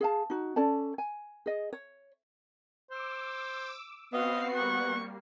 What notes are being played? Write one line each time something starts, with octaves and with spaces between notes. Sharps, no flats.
G#4 F5 A5
D#4 F#4
C#4 A4 D5 A5
G#5
G#4 D#5
C#5
C5 D6 E6
B3 C4 F#4 D#5 F5 C7
G3 A#3 F#5 C#6